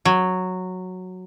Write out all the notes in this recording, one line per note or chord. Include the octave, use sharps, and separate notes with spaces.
F#3